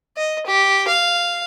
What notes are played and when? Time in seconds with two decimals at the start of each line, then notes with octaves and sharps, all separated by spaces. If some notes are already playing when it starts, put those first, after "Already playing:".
0.17 D#5
0.47 G4
0.88 F5